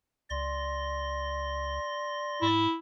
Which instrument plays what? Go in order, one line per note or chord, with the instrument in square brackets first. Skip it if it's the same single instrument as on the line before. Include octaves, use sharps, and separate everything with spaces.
[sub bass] C#2 [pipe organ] D5 C6 A#6
[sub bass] G#2 [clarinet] E4